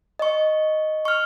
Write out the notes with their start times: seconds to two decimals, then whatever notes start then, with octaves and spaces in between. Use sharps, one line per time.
0.19 D#5 C#6
1.05 C#6 F6